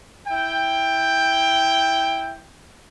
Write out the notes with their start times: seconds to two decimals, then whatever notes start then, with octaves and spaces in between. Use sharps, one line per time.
0.27 E4 G5